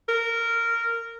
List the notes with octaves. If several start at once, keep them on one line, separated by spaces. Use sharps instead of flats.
A#4